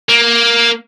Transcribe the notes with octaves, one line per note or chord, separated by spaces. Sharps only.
A#3